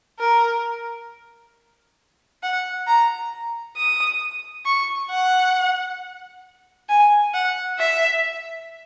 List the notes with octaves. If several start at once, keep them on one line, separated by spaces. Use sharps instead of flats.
A#4
F#5
A#5
D#6
C#6
F#5
G#5
F#5
E5